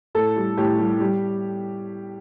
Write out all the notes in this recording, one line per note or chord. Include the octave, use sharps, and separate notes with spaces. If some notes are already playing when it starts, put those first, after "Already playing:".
A2 A4
G3
A2 G4
G3
G3